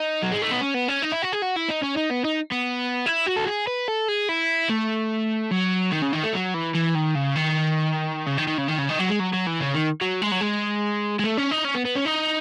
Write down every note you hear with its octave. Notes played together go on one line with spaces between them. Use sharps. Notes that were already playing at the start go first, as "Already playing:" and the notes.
Already playing: D#4
F#3
G#3
A3
B3
C#4
B3
C#4
D#4
E4
F#4
G#4
F#4
E4
D#4
C#4
D#4
B3
D#4
B3
E4
F#4
A4
G#4
B4
A4
G#4
E4
A3
F#3
D#3
C#3
D#3
A3
F#3
E3
E3
D#3
C#3
D#3
C#3
D#3
D#3
C#3
D#3
C#3
D#3
F#3
G#3
F#3
F#3
E3
C#3
D#3
F#3
G#3
F#3
G#3
G#3
A3
C#4
D#4
C#4
B3
B3
C#4
D#4